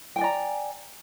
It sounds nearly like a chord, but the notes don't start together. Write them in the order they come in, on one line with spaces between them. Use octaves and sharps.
G5 G#5 D5 A#5